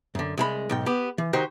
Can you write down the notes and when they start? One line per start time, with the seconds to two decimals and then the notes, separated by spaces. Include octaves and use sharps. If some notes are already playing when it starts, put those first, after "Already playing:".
0.15 F#2 D3
0.37 C2 G#3 B5
0.70 B1 G#2 G5
0.86 B3 G4
1.18 E3
1.33 D#3 D#4 F#4 G4 C5